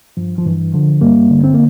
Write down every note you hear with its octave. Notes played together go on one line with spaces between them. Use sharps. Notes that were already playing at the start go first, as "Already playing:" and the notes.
G2 F3
F3
G2 E3
D3 F3
G2 G3 A#3
D3
C4
A#3